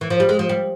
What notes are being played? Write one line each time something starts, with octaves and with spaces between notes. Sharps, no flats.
E3
F3
G3
G#3
F3
G3